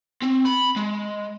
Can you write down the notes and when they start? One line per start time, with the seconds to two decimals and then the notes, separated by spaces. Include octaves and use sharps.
0.23 C4
0.46 B5
0.77 G#3